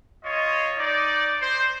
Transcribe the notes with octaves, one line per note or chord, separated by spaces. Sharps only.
F4 C#5 D#5
D#4 D5
C5